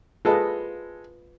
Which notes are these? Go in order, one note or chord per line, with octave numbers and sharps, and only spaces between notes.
G#3 F4 A4 B4 D#5